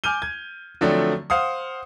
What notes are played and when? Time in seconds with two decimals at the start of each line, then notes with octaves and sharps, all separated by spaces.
0.04 G#5 D6 F6 G6 D#7 G7
0.22 G#6
0.81 D3 F3 F#3 A3 C4 D4
1.30 C5 F5 F#5 D#6